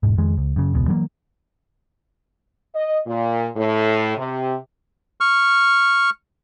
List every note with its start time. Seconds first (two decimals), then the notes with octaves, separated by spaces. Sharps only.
0.03 E1 G#2
0.18 F2 D#3 G#3
0.37 C#2
0.56 F#2 C#3
0.74 E1 C#2 B2
0.88 E3 F#3 A3 A#3
2.74 D#5
3.06 A#2
3.56 A2
4.17 C3
5.21 C#6 F6